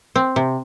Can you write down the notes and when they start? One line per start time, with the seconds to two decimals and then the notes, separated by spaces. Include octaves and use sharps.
0.16 C4
0.36 C3